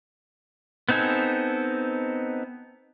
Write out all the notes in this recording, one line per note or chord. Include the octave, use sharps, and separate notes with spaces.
B3 C4 D#4 A4 G#5